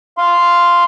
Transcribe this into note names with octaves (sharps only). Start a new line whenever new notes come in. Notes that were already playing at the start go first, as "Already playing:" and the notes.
F5 C6